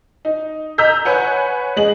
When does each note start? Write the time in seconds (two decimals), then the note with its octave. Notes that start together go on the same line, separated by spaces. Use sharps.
0.25 D#4
0.78 D#5 A#5 E6 G6 B6
1.05 B4 C#5 F#5 G#5
1.76 G#3 D#5 F#7